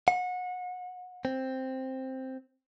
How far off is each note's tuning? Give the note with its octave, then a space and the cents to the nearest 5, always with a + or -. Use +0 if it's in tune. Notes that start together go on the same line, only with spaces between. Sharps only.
F#5 -30
C4 +5